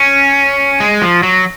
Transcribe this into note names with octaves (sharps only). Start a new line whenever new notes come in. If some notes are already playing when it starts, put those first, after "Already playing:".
Already playing: C#4
G#3
F3
F#3